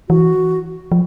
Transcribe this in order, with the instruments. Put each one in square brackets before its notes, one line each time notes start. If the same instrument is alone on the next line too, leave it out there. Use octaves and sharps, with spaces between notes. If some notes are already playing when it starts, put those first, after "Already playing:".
[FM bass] E3 [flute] F#4
[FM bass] F3